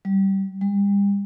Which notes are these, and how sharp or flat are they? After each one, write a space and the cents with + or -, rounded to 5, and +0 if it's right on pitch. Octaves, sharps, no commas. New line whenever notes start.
G3 -15
G3 +40